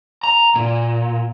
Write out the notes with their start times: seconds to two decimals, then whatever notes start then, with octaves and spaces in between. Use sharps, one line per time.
0.23 A#5
0.56 A#2